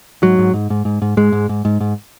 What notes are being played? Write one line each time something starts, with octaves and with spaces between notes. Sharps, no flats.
G#2 F#3
G#2
G#2
G#2
G#2
G#2
G#2 G#3
G#2
G#2
G#2
G#2